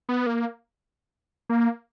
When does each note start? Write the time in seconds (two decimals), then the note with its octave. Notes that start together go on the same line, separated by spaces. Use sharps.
0.09 B3
0.26 A#3
1.49 A#3